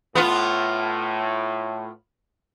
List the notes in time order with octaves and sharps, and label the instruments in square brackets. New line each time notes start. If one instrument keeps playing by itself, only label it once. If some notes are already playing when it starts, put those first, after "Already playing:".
[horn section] A2 [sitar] B3 F4